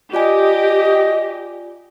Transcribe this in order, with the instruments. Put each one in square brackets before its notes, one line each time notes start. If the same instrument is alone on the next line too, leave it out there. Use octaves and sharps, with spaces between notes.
[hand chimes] F4 D5 G#5 [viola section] G4 [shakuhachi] D#5